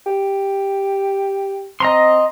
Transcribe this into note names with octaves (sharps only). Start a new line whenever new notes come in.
G4
C4 D#5 A#5 C6